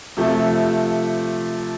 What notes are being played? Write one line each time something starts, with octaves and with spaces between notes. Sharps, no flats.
C3 F3 A3